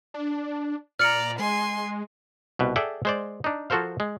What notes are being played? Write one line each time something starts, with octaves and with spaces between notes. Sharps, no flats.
D4
A#2 D5 A#5 F6 C#7
G#3 G#5 C6
C2 B2 B4
G#4 A4 D5 E5 F#5 G5
G#3 C5 D5
D4 D#4
F3 F#4 A4 A#4 C5 F5
G#3